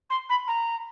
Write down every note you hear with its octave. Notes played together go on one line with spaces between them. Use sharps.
C6
B5
A#5